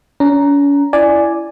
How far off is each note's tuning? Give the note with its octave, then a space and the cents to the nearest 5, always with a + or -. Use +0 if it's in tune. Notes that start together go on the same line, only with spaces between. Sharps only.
C#4 +40 A#5 +0
E4 +15 D5 +0 G#5 +0